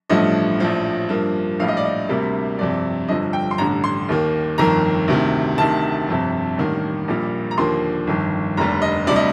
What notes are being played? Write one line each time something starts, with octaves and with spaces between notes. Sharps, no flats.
A1 G2 F3 A3 D#5
A#1 A2 F3
G2 F3 A#3
A#1 A2 G3 F5
D#5
D5
D#5
D2 C3 G3 A#3
G1 F2 C3 D5
G1 G2 D3 F3 D#5
G5
C6
A1 G2 D3 A#5
C6
D#2 D#3 A#3
G1 F2 D#3 A#3 A#5
D2 C3 D#3
D2 C3 D#3 A5
G1 F2 C3
A1 G2 D#3 A#3
A#1 A#2 G3 A#3
A#5
D#2 D3 F3 A#3 C6
G1 F2 D#3
F1 D#2 D3 G3 A#5
D#5
D2 C3 G3 D5
D#5